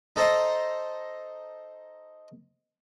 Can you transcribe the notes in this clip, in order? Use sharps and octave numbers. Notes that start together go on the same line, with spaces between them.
D#4 A4 C5 D#5 A#5 C6